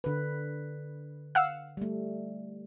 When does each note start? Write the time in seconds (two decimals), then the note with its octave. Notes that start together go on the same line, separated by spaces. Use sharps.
0.04 D3 B4
1.35 F5 F#5 E6
1.77 G3 A3